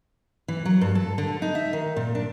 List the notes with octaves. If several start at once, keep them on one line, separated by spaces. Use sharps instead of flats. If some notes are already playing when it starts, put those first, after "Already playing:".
E3
F#3
G2
A4
D3
D#4
E5
D#3
A#2
D4